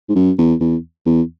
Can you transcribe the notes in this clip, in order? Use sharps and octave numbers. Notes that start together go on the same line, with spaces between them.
G#2
F#2
E2
E2
E2